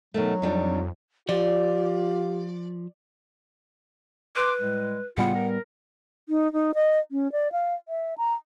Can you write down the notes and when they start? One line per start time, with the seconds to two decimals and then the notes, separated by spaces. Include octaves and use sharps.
0.14 B2 D#3 F#3 A3
0.42 F2 G3 D4 D#4
1.29 F3 F4 G4 D5
4.36 B4 C6 D6
4.60 A2 G3 G#3
5.18 A2 C#3 G3 B3 F4 F#5
5.34 A#4
6.29 D#4
6.53 D#4
6.74 D#5
7.11 C#4
7.32 D5
7.52 F5
7.88 E5
8.18 A#5